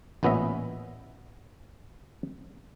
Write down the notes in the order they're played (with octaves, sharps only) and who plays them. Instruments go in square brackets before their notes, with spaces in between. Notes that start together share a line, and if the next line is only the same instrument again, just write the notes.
[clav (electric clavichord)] A1 A#2 B3 C#4 D#5 E5